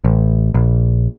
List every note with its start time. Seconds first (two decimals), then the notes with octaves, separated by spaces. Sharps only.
0.04 A1
0.54 A#1